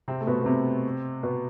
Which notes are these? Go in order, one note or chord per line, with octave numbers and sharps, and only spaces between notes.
C3 C4
A3
B2 B3
B3
C3 C4
B2 B3